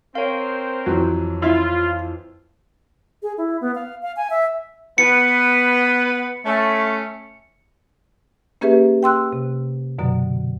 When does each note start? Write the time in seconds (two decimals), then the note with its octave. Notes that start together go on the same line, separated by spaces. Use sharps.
0.15 C4 A#4 C5 C#5 F5
0.86 F2 E3 F#3
1.42 E4 F4
3.23 G#4
3.38 E4
3.61 B3
3.75 F5
4.02 F5
4.16 G#5
4.30 E5
4.98 B3 B4 C#7
6.45 A3 C#4
8.61 A#3 C#4 G4 G#4 B4 E5
9.03 G5 C6 E6 F#6
9.33 C3
9.99 F#2 B2 D3 F#3